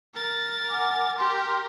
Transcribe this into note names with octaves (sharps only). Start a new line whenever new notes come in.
A#4 A6
F#5 G#5 D6
G4 A#4 C6